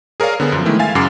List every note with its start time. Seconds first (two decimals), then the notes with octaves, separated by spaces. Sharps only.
0.20 G#4 A#4 C#5 D5 F5
0.40 D3 B3 G#4
0.52 F#2 F3
0.65 D#3 E3 G#3 A3 E4
0.79 E5 F5 G#5 A6
0.95 F#2 C#3 F#5 D6 A6 C7